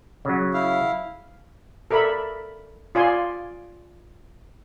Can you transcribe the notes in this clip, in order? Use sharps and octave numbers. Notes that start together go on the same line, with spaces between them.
C#3 F#3
E4 F5
A4 A#4 D5 E5 B5
F4 D5 G#5 C6